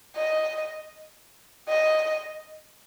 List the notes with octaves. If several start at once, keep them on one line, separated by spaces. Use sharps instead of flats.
D#5
D#5